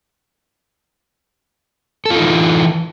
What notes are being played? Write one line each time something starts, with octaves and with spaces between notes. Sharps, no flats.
E3 D#4 F4 A4